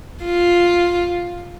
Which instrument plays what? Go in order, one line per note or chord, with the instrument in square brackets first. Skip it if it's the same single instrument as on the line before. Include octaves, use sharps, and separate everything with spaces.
[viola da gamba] F4